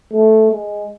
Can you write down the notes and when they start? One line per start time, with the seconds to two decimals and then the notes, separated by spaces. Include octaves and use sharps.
0.13 A3
0.52 G#3